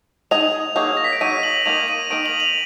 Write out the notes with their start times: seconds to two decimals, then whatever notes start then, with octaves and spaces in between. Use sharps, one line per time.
0.31 D#4 G#4 D#5 F7
0.76 F#3 A#3 D#4 G#4
0.97 A#6
1.04 B6
1.12 D7
1.21 F#3 A#3 D#4 G#4 D#7
1.43 F#7
1.66 D#3 A#3 D#4 A#4 F7
1.88 D#7
2.10 D#3 A#3 D#4 A#4 D7
2.26 F#7
2.40 F7